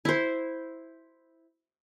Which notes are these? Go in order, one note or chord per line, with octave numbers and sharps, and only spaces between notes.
E4 C5